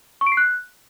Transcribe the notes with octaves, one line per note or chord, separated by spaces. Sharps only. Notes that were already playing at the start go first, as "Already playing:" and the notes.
C#6
D7
C7
F#6